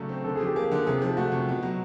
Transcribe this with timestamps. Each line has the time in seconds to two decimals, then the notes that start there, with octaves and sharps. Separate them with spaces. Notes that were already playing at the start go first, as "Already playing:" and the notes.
Already playing: C#3 F#3 A3 D4 A4
0.09 C4
0.24 D3 A4
0.35 G#4
0.41 F3 G4
0.56 A#3 G#4
0.71 D3
0.86 C3 G#4
1.02 F3
1.17 A3 F#4
1.32 C3
1.48 B2
1.63 F#3